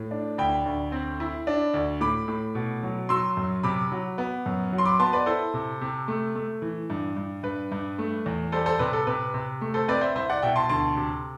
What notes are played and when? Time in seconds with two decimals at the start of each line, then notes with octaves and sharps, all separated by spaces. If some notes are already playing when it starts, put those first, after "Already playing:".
Already playing: A2
0.11 D4
0.38 D2 G5 B5
0.66 D2
0.92 C4
1.20 E4
1.47 D4
1.74 D2
2.00 A2 B5 D6
2.28 A2
2.55 B2
2.83 F#3
3.09 F#3 C6 E6
3.37 F#2
3.63 C3 B5 D6
3.92 F#3
4.18 B3
4.46 F#2
4.73 F#3
4.78 C6
4.85 B5 D6
5.00 B3 A5 C6
5.13 B4 D5
5.26 E4 A4 C5
5.54 C3
5.81 C3
6.08 A3
6.35 A3
6.62 E3
6.90 G2
7.16 G2
7.43 G2 B4
7.72 G2
7.98 A3
8.26 E2
8.52 G3 A4 C5
8.66 A4 C5
8.79 C3 B4
8.93 A4
9.07 C3 B4
9.34 C3
9.61 A3
9.74 A4 C5
9.88 C4 B4 D5
10.01 C5 E5
10.15 C2 C5 E5
10.30 D5 F#5
10.42 B2 E5 G5
10.56 A5 C6
10.69 D2 A5 C6
10.96 C3